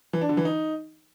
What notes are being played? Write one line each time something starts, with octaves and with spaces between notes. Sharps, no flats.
E3
D4
D3
E3
D#4